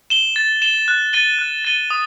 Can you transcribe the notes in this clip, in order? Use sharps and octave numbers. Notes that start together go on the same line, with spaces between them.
E7 G7
A6
E7 G7
F#6
A6 D#7 G7
F#6
A6 D#7 G7
D#6